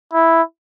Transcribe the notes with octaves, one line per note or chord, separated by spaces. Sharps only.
E4